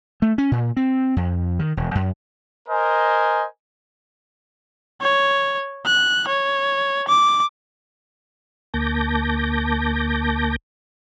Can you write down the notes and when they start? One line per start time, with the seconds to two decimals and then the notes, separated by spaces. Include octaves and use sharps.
0.22 A3
0.38 C#4
0.51 A#2
0.77 C4
1.16 F2
1.59 D#3
1.77 E1
1.95 F#2
2.69 A#4 C5 D#5 G#5
5.01 C#5
5.86 F#6
6.28 C#5
7.08 D6
8.74 D2 A#3 A5 D6 G6 A#6